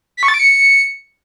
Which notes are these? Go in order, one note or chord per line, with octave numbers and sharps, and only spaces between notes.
B6
C#6
A6
D7
C#7